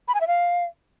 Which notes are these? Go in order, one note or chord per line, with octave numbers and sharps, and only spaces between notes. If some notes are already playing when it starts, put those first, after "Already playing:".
B5
G#5
E5
F5